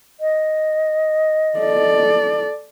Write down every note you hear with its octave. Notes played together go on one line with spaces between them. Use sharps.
D#5
A4 D5